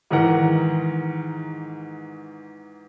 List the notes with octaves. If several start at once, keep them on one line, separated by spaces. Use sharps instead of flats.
G#2 D#3 E3 A#4 F#5